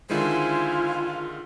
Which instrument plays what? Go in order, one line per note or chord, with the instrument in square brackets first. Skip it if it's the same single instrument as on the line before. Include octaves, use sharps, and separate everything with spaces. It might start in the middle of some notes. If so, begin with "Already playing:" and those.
[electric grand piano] D3 D#3 G#3 [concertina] E4 C5 G#5 [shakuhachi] F4